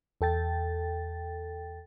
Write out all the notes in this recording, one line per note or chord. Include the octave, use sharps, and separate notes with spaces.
E2 A4 G5 A6